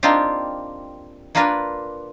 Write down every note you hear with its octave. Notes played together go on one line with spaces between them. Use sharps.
A#3 C4 D4 D#4 F4 G4
A#3 D4 F4 A#4 B4